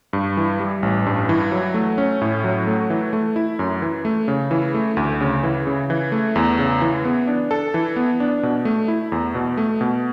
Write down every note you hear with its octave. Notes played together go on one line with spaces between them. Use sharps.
G2
E3
G3
A1
G2
E3
F#3
A3
C#4
A2
F#3
A3
E3
A3
E4
F#2
E3
A3
C#3
E3
A3
D2
C#3
E3
C#3
E3
A3
E2
C#3
E3
B3
D4
A4
E3
B3
D4
B2
A3
E4
E2
B2
A3
B2